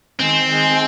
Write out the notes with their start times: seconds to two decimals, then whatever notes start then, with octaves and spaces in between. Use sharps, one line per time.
0.20 D#3 G#3 C4
0.48 D#3 G#3